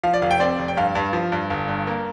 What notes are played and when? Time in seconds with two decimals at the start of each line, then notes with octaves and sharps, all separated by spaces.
0.03 F3 F5
0.13 D5
0.22 F1 F5
0.31 G5
0.40 C4 D5
0.59 F1
0.68 G5
0.77 G2 F5
0.95 G2
1.13 F3
1.32 G2
1.50 G1
1.68 G2
1.87 A#3